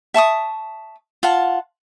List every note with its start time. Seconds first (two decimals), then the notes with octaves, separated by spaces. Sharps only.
0.14 E5 A5 C#6 D#6
1.23 F4 F#5 A5